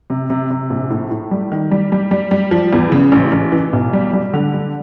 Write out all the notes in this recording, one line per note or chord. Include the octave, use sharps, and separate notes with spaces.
C3
C3
C3
A#1
A2
A2
G3
D#3
G3
G3
G3
G3
F3
E2
C#3
A1
A1
E3
B1
G3
G3
D3
G3